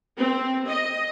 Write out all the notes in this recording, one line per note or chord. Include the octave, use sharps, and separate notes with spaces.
C4
D#5